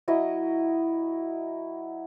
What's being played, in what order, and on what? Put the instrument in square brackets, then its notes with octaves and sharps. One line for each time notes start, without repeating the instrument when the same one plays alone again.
[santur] F#3 E4 D#5